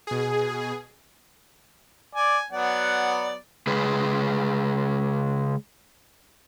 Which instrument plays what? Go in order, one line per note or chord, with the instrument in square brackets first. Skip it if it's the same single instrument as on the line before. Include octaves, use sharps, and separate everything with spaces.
[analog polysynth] B2 G#4
[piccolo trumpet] D5 [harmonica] G#5
[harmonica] F#3 B3 D5 [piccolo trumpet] F#5
[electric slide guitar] C#3 G#3 G#4 B4